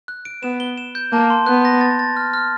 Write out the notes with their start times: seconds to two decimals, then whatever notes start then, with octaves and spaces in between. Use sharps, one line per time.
0.08 F#6
0.25 D7
0.43 B3 E7
0.60 G7
0.78 E7
0.95 G6
1.12 A#3 A5
1.30 C6
1.46 B3 F#6
1.65 A#6
1.81 A6
1.99 A6
2.16 F6
2.34 F6